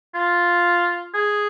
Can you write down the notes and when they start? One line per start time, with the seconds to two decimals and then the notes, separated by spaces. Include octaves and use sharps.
0.14 F4
1.14 G#4